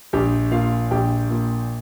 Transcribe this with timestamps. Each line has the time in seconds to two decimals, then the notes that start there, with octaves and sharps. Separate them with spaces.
0.13 A#1 G4
0.51 A#2 F4 F5
0.91 A#1 G4 G5
1.30 A#2